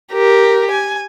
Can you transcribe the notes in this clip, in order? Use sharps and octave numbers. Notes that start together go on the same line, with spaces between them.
G4 A#4
G#5